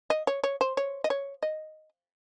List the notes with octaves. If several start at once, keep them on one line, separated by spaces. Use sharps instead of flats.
D#5
C#5
C#5
C5
C#5
D#5
C#5
D#5